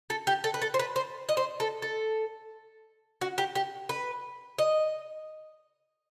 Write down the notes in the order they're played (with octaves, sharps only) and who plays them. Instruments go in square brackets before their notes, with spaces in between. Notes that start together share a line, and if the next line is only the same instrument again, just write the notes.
[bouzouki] A4
G4
A4
B4
A4
C5
B4
C5
D#5
C5
A4
A4
F#4
G4
G4
B4
D#5